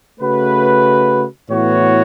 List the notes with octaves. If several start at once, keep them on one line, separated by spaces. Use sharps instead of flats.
C#3 A3 F#4 B4
A2 E3 B3 F#4 C#5